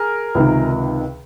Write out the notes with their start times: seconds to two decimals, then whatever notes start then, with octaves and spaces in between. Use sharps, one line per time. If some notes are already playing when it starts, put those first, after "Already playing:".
Already playing: G#4 A#4
0.35 C#2 C3 D#3